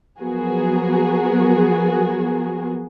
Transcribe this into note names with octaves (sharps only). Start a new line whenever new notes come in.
F3 F#3 B3 F#4 G#4 A#4